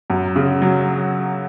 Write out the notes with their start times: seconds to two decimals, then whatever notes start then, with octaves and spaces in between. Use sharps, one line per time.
0.10 F#2
0.36 C#3
0.62 F#3